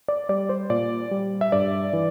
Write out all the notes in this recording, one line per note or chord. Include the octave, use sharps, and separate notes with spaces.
D5
G3 D5
C5
A#2 D5
G3
E5
G2 D5
E3